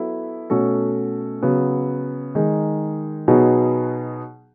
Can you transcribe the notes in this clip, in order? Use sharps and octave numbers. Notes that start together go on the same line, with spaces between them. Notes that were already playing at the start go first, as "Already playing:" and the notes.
Already playing: F#3 B3 E4 A4
B2 A3 C#4 F#4 A4
C#3 F#3 B3
D#3 G#3 D#4 G#4
B2 F#3 B3 D#4 G#4